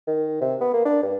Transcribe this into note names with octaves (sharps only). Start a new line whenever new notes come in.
D#3
C3
B3
A#3
D4
G2